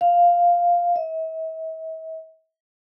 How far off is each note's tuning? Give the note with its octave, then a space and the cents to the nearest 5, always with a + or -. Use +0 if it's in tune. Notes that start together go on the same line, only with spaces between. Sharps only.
F5 +0
E5 -45